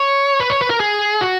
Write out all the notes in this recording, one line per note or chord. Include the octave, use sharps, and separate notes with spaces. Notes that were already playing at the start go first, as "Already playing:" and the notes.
Already playing: C#5
B4
C#5
B4
A#4
G#4
F#4